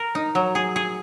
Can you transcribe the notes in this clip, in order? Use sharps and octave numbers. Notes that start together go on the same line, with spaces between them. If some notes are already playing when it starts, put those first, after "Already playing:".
Already playing: A#4
D#4
F#3
G#4
G#4